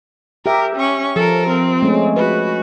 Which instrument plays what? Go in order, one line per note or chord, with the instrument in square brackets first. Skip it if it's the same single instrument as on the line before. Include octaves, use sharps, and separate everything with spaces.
[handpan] G4 E5 [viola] A#4
[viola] C#4 C#6
[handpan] F3 [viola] A4 A#4
[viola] C4
[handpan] G#3 A3 C#4
[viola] F#4 [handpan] B4